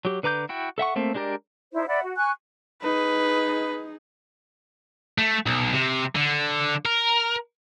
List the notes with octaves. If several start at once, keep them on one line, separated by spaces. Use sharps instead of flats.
F#3 G4
D3 B4 A#5 D6 G6
E4 F#4 G5
A4 E5 F#5 C#6
A3 A#3 C4 E5
G#3 D4 G4 A#4 D5
D#4 E4 C5 D5
D5 E5 F#5 B5
F#4
G#5 C#6 F#6
D#4 G#4 B4
A3
B1
C3
D3
A#4